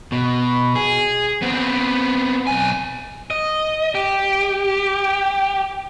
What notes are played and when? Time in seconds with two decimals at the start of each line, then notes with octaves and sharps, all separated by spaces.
0.12 B2
0.75 G#4
1.42 B3 C4
2.47 B1 G#5
3.31 D#5
3.95 G4